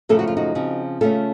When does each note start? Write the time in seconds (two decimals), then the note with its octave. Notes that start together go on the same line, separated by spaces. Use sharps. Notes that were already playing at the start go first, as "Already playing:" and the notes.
0.09 F#2 C#3 F3 A3 A4
0.19 F#4
0.27 F4
0.37 D#4 F#4
0.55 C#3 F3 C4
1.01 C#3 A3 C#4 F4 A4